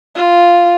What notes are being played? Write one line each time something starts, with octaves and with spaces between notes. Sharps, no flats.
F4